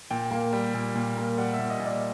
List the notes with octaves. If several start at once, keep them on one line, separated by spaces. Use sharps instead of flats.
A#2 G5
A#3
G3
A#2
A#2
A#3
G3 F#5
E5
A#2
D#5
A#2
D5